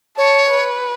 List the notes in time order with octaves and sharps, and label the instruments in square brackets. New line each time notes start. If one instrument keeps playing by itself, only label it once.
[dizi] C#5 [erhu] A5
[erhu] B4